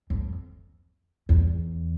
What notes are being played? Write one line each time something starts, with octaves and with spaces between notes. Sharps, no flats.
F2
E2